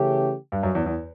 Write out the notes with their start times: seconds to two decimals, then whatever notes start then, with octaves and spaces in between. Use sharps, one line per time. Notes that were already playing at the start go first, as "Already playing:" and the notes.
Already playing: C#3 E3 A3 C#4 G4
0.52 G2
0.63 F#2
0.75 E2
0.86 E2